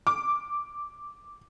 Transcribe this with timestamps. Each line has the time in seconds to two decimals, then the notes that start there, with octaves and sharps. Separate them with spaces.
0.07 D6